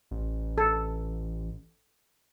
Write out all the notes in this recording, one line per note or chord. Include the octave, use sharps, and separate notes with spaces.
A1
A4